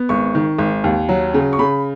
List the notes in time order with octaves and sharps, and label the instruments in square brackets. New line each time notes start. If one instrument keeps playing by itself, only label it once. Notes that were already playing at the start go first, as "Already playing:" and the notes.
Already playing: [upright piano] B3
G#1 C#6
D#3
G#1
D#2
F#3
C#3
C#6
C#3 B5